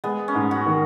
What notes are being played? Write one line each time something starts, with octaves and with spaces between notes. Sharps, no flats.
G#3 B3
C#4
G#2
F#4
D#3